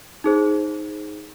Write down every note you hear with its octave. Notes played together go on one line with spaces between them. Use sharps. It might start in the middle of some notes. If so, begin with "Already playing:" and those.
D#4 G#4 C5